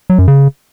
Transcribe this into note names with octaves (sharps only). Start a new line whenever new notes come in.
F#3
F#2
C#3